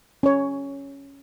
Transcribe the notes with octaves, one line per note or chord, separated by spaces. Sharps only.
C#4 C#5